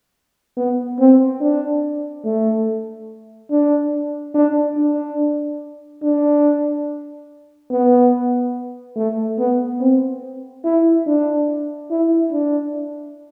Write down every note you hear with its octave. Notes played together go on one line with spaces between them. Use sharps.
B3
C4
D4
A3
D4
D4
D4
D4
B3
A3
B3
C4
E4
D4
E4
D4